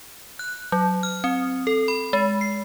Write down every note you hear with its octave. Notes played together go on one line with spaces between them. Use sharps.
F#6
F#3
F6
C4
A4
B5
G#3
C7